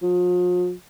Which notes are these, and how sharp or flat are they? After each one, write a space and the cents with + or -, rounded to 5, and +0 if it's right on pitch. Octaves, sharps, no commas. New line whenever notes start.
F3 +40